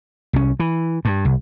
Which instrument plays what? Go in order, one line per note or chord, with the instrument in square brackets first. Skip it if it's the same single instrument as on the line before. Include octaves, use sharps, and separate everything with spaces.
[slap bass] C2 C#4
E3
G2
C2